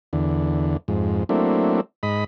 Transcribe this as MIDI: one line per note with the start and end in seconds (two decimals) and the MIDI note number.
0.13 0.77 40
0.13 0.77 50
0.88 1.24 41
0.88 1.24 44
1.29 1.81 54
1.29 1.81 57
1.29 1.81 58
1.29 1.81 60
1.29 1.81 62
1.29 1.81 64
2.03 2.24 44
2.03 2.24 75
2.03 2.24 83